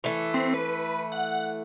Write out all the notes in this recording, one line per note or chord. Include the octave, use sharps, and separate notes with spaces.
E3 A3
C4
B4
F#5